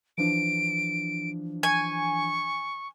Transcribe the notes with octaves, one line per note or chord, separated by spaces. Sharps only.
E3 F3 D4 D7
G#5 C#6